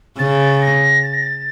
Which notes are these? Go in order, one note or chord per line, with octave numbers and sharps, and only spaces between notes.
C#3 A6
A#6
A6
A#6
A6